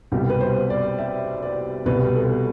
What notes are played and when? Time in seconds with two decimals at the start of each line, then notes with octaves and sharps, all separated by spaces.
0.12 C2 B2 G3 G4
0.30 B4
0.41 C5
0.70 D5
0.99 E5
1.43 D5
1.86 C2 B2 G3 B4
2.15 A4